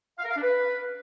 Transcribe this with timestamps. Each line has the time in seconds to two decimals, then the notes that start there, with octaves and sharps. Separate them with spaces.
0.18 F5
0.24 A#4
0.30 F5
0.36 D4
0.42 B4